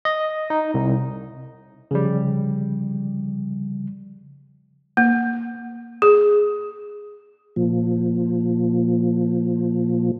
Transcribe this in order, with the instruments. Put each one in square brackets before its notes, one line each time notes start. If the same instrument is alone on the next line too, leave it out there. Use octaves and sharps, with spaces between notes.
[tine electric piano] D#5
D#4
C2
C#3 F3 G3
[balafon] A#3
G#4
[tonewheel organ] A#2 F3